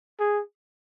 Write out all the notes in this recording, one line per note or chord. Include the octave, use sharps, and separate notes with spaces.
G#4